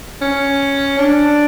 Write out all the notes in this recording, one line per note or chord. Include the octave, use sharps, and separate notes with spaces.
C#4
D4